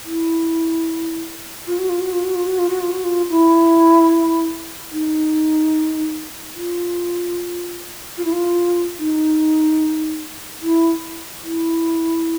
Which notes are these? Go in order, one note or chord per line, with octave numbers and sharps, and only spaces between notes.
E4
F4
F#4
F4
F#4
F4
F#4
F4
F#4
F4
F#4
F4
F#4
F4
E4
D#4
F4
F4
E4
F4
D#4
E4
E4